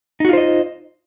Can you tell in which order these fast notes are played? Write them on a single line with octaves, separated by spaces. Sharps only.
D#4 F#4 F4 C5 D#5